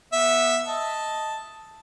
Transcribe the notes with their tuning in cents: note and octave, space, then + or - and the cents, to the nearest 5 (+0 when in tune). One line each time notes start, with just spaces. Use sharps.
B3 -20 E5 +0
D#5 +5 A5 +0